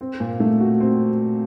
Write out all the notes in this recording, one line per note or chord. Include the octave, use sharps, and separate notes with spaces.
C4
A#2
A3
F#4
C4